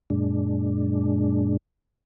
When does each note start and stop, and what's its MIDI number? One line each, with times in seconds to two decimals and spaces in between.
0.10 1.57 42
0.10 1.57 46
0.10 1.57 56
0.10 1.57 62